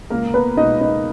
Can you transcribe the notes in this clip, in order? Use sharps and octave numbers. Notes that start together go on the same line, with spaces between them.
C#2 A#3 A#4
B3 B4
B2 G#3 D#4 D#5
D#4 D#5